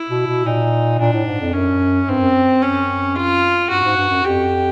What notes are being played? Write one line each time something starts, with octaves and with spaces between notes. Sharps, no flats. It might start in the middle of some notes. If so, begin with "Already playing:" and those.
Already playing: E4
B2
B2
A#2 D#4
A#2 D4
A2
G#2
F2
F#2 C#4
G2 C4
F#2
F#2
F#2 C#4
F4
G2 F#4
G#2
G2
F#2
F2 G4